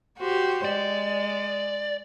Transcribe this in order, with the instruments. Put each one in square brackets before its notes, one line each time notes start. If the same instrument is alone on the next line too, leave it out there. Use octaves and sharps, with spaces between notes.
[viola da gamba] F#4 G4 C5
[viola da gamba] G#3 [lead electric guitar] D5